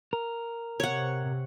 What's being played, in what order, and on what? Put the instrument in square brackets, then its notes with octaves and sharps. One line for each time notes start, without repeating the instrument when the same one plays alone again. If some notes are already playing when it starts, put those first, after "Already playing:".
[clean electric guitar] A#4
[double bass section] C3 [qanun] C#5 F#5